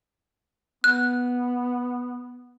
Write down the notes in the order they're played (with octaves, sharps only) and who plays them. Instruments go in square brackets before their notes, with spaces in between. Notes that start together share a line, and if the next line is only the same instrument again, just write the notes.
[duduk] B3 [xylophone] F#6